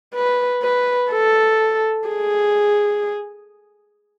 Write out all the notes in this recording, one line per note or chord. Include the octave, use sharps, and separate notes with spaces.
B4
B4
A4
G#4